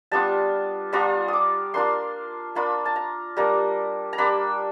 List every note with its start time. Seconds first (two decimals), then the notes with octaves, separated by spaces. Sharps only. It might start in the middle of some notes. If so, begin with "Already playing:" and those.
0.11 G3 B3 D4 F4 A5
0.93 G3 B3 D4 F4 A#5
1.28 D#6
1.33 D6
1.74 A#3 D4 F4 C6
2.55 A#3 D4 F4 B5
2.85 A5
2.96 A#5
3.37 G3 A#3 D4 A#5
4.13 A#5
4.18 G3 A#3 D4 B5